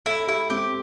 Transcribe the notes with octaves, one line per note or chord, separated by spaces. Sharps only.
E4 A4
E4 G4
C4 G4